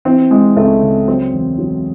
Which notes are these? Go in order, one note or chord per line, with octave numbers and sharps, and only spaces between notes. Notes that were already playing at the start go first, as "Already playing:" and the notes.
E3 C4
E3 G#3
C#2 A3
C#3
F#3 C4
E1
F#3